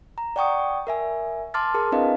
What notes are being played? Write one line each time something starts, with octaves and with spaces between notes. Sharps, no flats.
A#5
D5 F#5 G5 C#6 D#6
A#4 E5 G#5
A5 C6 D6 F6 A6
G#4 A#4 A5
C4 D4 E4 B4 D#5 F5